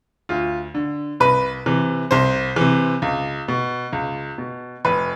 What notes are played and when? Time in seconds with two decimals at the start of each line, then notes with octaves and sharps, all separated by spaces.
0.29 D2 F4
0.75 D3
1.20 C2 B4
1.66 C3 E3
2.11 C2 C5
2.56 C3 E3
3.02 C#2
3.48 B2
3.93 C#2
4.38 B2
4.85 F1 B4